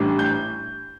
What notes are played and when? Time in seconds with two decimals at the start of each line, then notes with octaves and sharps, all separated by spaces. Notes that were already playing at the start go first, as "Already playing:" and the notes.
Already playing: A1 A2 G3 D4
0.19 G6